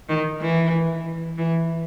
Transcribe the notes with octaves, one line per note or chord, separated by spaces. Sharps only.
D#3
E3
E3